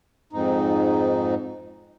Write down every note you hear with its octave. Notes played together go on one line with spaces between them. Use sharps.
F2 G#2 D#4